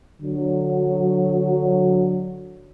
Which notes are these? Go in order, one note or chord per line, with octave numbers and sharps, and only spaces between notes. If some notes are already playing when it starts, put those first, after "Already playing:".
D3 F#3